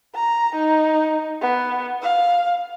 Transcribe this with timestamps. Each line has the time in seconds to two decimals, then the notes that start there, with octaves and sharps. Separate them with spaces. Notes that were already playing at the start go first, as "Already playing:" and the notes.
0.15 A#5
0.55 D#4
1.42 B3
2.02 F5